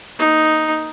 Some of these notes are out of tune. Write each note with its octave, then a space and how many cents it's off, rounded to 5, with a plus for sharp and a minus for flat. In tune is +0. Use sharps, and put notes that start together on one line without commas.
A#3 +0 D#4 +0